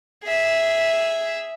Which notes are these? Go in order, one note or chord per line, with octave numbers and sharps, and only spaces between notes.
G#4 E5